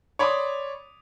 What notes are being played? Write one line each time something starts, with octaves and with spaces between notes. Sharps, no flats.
C#5 D5 B5 C6 D6 D#6